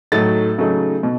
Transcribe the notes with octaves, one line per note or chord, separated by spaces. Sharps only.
A2 F#3 A3 D#4 A6
C#3 F#3 A3 D#4
B2